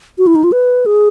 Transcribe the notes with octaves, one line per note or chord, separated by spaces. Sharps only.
F#4
E4
D#4
F4
B4
G#4